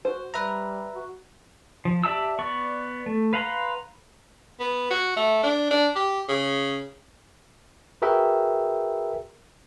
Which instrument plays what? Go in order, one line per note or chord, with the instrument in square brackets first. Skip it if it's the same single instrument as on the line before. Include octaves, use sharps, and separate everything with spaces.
[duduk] F#4 [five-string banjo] C5
[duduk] G3 [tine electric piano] B4 E5 A#5
[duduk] F#4
[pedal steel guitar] F3
G4 D5 E5 A5 E6
B3 D5 C#6
A3
B4 F5 F#5 A#5 C6
[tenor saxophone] B3
F#4
A3
D4
D4
G4
C#3
[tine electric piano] F#4 G#4 A#4 B4 E5 G5